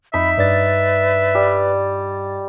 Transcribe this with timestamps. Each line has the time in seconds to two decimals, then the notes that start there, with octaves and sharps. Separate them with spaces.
0.14 F2 D#4 E5 B5 B6
0.38 G2 B4 D5 A6
1.35 G3